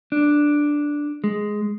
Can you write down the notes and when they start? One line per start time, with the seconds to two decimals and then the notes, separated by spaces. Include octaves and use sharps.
0.12 D4
1.24 G#3